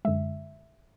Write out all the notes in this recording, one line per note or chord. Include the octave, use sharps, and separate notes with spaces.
F#2 D3 G#3 E5